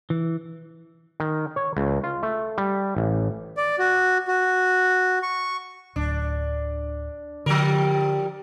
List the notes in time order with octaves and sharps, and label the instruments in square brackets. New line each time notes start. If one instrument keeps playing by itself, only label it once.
[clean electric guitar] E3
[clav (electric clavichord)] D#3
C#5
C#2
F4
A3
G3
A1
[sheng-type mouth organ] D5
F#4
F#4
C#6
[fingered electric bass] D1 [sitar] D4
[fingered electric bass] D3 [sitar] F3 G3 A#4